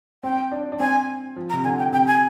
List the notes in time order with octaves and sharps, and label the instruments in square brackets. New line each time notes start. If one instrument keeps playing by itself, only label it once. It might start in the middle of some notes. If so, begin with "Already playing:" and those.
[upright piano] C4 [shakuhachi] G5
[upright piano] D4
D4
[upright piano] C4 [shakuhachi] G#5
[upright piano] F3
[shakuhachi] A#5
[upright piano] C3
[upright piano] D3 [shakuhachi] G#5
[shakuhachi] G5
[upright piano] C3 [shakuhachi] G5
[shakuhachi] G#5